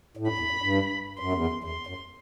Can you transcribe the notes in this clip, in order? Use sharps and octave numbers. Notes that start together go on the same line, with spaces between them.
A2
G2 B5
E2
F#2
G2
F#2 C6
E2
F#2
E2 C6
F#2